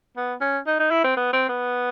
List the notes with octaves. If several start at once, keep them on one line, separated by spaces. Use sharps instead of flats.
B3
C#4
D#4
D#4
E4
C4
B3
C4
B3